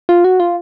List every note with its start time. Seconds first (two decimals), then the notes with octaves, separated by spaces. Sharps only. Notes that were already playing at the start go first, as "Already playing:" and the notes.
0.09 F4
0.24 F#4
0.40 F4